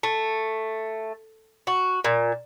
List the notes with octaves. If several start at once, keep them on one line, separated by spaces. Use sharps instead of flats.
A3
F#4
A#2